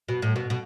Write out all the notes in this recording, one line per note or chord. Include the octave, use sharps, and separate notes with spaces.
B2
A2
B2
B2